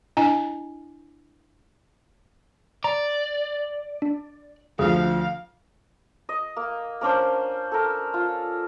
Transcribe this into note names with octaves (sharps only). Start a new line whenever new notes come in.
D4 E4 D#5 G#5 A#5
D5 A#5
D4
D2 F3 G#4 F5
D#5
A#3
A#3 C#4 D4 C5
A4 A#4
F4